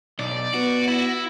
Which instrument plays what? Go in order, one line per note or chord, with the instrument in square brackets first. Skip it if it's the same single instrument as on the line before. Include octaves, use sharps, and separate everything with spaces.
[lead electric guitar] B1 [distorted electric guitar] D5
[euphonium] B3 [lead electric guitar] F#4
[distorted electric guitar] E4